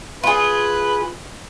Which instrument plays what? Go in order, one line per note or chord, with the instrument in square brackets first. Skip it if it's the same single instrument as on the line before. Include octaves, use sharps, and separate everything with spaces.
[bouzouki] F4 G#4 [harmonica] B4